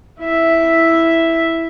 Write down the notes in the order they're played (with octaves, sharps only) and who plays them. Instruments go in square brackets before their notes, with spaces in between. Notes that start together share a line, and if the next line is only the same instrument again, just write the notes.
[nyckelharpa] E4 E5